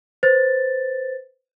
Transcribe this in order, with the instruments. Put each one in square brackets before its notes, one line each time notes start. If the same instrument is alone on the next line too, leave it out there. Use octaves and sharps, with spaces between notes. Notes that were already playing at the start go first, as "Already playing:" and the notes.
[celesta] B4 C5 A6